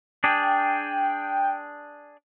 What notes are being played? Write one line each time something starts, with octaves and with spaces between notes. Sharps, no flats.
D4 G#4 G5